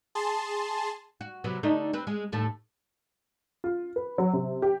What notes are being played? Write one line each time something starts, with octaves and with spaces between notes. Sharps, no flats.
G#4 A5 C6
F#4
C3 F#3 B3
D3 A3 D#4
C4 B4
G#3
D#2 A2 A3
F4
B4
F#3
C3
G4